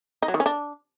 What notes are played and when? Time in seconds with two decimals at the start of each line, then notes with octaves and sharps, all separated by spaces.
0.23 D#4
0.28 F#3
0.34 D#3
0.40 C#4
0.46 D4